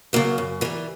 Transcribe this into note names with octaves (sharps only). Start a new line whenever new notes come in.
C#3 F#3 A#3
F#2
E3 G3 A#3